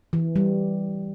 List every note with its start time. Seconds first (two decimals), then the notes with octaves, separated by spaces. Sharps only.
0.13 E3
0.36 G3